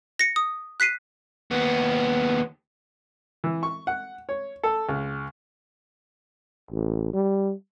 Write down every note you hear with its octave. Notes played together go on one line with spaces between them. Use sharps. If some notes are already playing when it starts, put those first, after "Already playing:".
A#6 C#7
D#6
F#6 B6 C7 D#7
D#2 B3
E3
C#6
F#5
C#5
A4
C#2
A1
G3